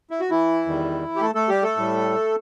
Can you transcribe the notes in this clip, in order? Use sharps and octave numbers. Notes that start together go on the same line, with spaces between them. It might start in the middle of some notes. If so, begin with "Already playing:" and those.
E4
F#4
E3 E4
E2 D#3 G3
G4
A3 A4
A3 A4
G3 G4
A3 A4
A2 G3